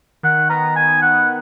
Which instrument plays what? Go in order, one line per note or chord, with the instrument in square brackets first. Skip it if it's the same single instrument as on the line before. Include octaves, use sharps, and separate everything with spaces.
[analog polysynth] D#3 [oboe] F#5
[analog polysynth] B3 [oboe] A#5
[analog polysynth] D#3 [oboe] G#5
[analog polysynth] D#3 [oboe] F#5